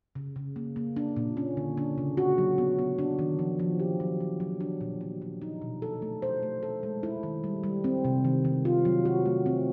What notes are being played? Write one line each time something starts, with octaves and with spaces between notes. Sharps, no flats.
C#3
C#3
A#3
A#3
D4
A#2
C#4
D3
D4
C#3
F#4
F#3
B3
B3
D4
D#3
F3
F3
G4
F#3
F#3
F#3
D4
A#2
F#3
F#3
D#4
B2
A4
A3
C5
A3
A4
G#3
E4
D#3
G3
G3
C4
C3
D#3
D#3
F4
F#3
F#4
A3
C4